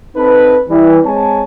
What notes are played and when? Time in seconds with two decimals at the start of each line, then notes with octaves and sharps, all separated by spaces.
0.16 C4 D#4 A4 B4
0.70 E3 G3
1.05 G#3 C4 C#5 G#5 A5